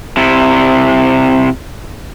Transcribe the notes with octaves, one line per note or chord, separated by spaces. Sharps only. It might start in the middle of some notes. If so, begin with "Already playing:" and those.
C3 E4